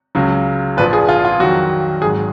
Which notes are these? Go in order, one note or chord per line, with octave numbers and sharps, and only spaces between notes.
C#2 C#3 F#3
A#1 A#2 F3 B4
G#4
F4
F4
F2 D#3 F#3 F#4
G#1 G#2 F#3 G#4